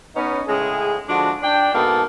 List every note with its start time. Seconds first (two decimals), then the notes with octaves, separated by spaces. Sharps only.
0.15 B3 C#4 D#4
0.48 A2 C#3 G#3 C#4 G#4
1.08 D3 F3 G#3 D4 F#4 A4
1.42 D4 G5
1.73 G#2 B2 A#3 B3 A4 A5